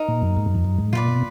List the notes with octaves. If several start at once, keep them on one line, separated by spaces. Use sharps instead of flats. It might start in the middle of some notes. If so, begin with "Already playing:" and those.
Already playing: D#4 A#4
A#2
F#2
G#2
F#2
F2
F#2
G#2
A#2 F4 B4 D5
B2